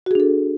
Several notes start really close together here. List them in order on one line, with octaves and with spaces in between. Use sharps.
F#4 G#4 D4 A4